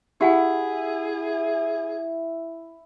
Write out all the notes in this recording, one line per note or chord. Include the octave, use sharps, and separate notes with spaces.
E4 G4 G#4 F#5 G#5